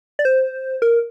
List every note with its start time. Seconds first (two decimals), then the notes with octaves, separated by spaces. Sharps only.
0.19 D5
0.25 C5
0.82 A#4